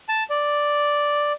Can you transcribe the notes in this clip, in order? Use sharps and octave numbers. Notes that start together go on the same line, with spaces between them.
A5
D5